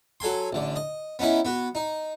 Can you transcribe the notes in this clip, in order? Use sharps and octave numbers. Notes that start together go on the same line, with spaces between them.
F#3 A4 G#5 C6
A1 D3
D#5
B3 C#4 D#4 E4
B3 F#4
D#4